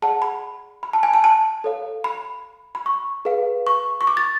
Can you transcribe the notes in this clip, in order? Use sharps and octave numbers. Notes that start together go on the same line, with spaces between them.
G#4 D5 F#5 A5
B5
B5
A5
G#5
A5
A5
A4 C#5 F5
B5
B5
C#6
G#4 B4 F5
C#6
C#6
D6
A6